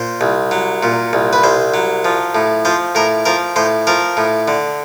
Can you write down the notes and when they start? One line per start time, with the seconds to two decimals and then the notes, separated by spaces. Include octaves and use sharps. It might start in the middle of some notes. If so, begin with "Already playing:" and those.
Already playing: A#2 C5
0.21 C2
0.51 F#3
0.83 A#2
1.13 C2
1.33 B4
1.44 C2 C5
1.74 F#3
2.05 F3
2.35 A2
2.65 F3 C5
2.95 A2 A#4
3.25 F3 A#4
3.56 A2 C5
3.87 F3 A#4
4.17 A2
4.48 D3